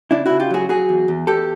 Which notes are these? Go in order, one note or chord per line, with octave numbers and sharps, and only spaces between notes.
C#3 D4 E4
C#3 E4 F#4
F4 G4
F#3 F#4 G#4
F#3 F#4 G#4
E2
E2
E2 G4 A4